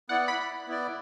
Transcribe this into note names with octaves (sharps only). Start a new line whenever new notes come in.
B3 E4 D5 F#5
B5
B3 E4 D5